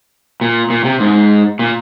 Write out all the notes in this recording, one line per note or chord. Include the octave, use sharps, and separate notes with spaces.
A#2
A#2
C3
G#2
A#2